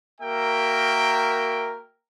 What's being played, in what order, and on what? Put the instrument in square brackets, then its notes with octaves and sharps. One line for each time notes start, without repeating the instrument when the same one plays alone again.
[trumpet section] A#3 F#4 A#4 E5 G5